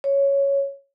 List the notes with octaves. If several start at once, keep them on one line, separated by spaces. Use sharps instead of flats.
C#5